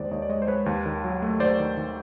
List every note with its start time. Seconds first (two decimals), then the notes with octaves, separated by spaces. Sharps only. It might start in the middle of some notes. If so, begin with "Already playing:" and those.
Already playing: D#2 D#3 G#3 C5 D5
0.11 D#2 C#5 D#5
0.22 D5
0.29 G#3 C#5 D#5
0.42 C5
0.48 G#3 B4 C#5
0.66 D#2
0.86 D#3
1.04 F#3
1.22 A3
1.40 D#2 C5 D5
1.59 D#3
1.77 D#3